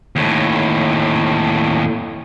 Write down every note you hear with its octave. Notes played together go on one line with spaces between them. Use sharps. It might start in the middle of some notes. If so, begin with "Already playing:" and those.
D#2 A2